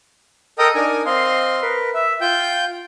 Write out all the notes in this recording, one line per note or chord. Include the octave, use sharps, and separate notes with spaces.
A4 A#4 D#5 G5 A#5 D#6
D4 D#4 A#4 G#5
C4 D#5 F5 C6
A#4 B4
E5
F4 G5 G6